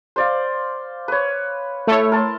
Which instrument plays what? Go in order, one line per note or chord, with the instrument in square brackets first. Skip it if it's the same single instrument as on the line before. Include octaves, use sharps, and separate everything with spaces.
[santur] C5 D5 F5
B4 C#5
[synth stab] A3 C#5 [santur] E4 E5
[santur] A#4 A5 C6